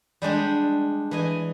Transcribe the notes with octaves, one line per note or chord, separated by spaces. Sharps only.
G3 G#3 D4 G4
E3 D#5 G#5